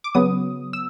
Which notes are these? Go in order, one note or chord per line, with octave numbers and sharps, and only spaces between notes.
D6
C#3 F#3 B3 D#6
E6